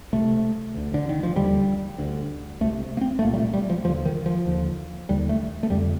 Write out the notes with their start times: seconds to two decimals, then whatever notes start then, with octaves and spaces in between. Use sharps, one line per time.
0.13 C2 C3 A3
0.74 D2 D3
0.94 D3
1.09 D#3
1.23 F3
1.36 D#2 D3 G3
1.98 D2 D3
2.61 C2 A3
2.64 C3
2.97 A#3
3.01 C4
3.19 A3
3.22 C2 A#2 A#3
3.33 G3
3.38 A3
3.53 G3
3.70 F3
3.85 D#2 D3 F3
4.05 D#3
4.26 F3
4.46 D#2 D3
5.09 D#2 D3 G3
5.29 A3
5.63 A3
5.70 F2 D3 G3